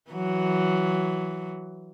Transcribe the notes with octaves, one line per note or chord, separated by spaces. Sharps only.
E3 F#3